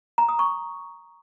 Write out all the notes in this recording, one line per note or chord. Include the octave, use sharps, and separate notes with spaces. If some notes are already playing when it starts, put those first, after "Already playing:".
A#5
D#6
C#6